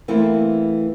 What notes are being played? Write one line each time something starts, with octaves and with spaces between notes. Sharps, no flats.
E3 A3 A#3 C4 E4